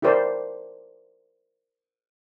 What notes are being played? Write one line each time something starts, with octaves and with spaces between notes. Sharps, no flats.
E4 G4 A#4 C5 D5